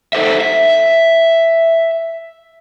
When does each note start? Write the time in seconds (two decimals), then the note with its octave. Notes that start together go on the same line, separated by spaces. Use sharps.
0.13 D#4 A4 C5 E5
0.41 E5